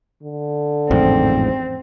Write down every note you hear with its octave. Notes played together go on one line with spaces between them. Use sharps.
D3
A1 F2 G#2 C4